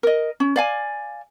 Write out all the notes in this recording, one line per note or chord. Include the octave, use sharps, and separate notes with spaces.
A#4 D#5
C#4
D5 F5 G#5